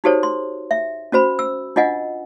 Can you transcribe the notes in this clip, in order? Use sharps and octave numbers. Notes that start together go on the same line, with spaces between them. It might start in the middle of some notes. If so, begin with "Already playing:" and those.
D#4 F#4 G4 A4 C5 C#5
C6
E5
C#4 F#4 C5 B5
E6
D4 F4 D#5 F#5 G#5